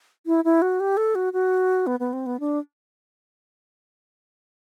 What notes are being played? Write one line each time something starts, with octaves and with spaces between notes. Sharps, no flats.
E4
E4
F#4
G4
A4
F#4
F#4
B3
B3
C4
B3
D4